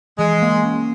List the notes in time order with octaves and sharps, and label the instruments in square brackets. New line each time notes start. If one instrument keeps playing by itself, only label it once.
[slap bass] E3 [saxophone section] G#3
[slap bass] A#3
C#4